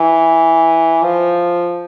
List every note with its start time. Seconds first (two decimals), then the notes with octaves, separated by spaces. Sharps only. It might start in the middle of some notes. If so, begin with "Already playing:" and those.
Already playing: E3
1.03 F3